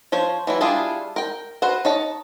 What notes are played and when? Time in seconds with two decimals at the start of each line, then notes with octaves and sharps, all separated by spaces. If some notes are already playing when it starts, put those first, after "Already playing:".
0.12 F3 C5 C#5
0.47 E3 F#3 E4
0.61 G3 D4 E4 F4 G#4
1.16 A#4 G5
1.62 F#4 B4 C5 F#5
1.85 D#4 C#5 A5